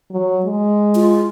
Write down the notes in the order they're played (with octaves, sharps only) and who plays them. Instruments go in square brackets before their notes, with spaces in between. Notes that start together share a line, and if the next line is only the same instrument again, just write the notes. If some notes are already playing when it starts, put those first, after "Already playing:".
[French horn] F#3
G#3
[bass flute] F4